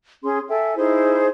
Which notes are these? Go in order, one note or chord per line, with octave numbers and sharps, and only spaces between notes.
C#4 G#4 C6
A4 E5 G5 G#5
D#4 E4 G#4 C5